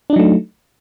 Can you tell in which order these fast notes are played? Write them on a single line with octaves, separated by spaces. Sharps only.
D4 D#4 F#3 A3